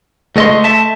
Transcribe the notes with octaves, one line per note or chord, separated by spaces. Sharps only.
C#2 A3 D#5 C6
E5 A5